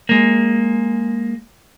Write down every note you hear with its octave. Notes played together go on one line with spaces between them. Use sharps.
G#3 A#3